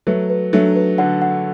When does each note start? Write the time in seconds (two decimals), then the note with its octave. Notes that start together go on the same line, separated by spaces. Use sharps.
0.07 F#3 A3 B4
0.30 B4
0.53 F#3 A3 D4
0.76 B4
0.98 D3 F#5
1.22 F#5